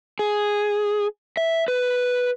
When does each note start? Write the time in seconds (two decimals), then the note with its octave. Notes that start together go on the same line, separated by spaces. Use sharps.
0.19 G#4
1.37 E5
1.68 B4